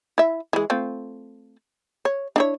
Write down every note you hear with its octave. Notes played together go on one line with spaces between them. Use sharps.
E4 E5
E3 G#3
A3 C4 F4
C#5
D4 E4 C#5